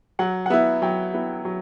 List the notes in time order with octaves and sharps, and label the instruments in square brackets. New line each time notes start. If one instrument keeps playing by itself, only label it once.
[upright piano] F#3 F#5
F#5
B3 E4 E5
F#3 G5
B3 E4
F#3